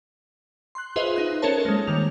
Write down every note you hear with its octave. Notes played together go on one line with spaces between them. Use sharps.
C6 F#6
F4 G#4 B4 C5 D#5 E5
D#4 F#6
C#4 A4 A#4 C5 C#5 A5
G#3 A#3
D#3 G3 F7